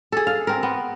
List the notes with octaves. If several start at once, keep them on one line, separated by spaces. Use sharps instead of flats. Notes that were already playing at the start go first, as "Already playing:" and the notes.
G#4 A4
F5
C4 A#4
B3